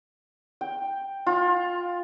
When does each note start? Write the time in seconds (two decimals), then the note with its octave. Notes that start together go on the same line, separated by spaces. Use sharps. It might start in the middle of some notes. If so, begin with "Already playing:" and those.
0.61 G5
1.27 F4